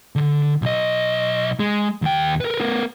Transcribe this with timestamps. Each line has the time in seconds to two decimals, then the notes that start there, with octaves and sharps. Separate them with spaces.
0.16 D3
0.62 B1 D#5
1.60 G#3
2.02 D#2 G5
2.41 A#4 B4
2.61 B3 A#4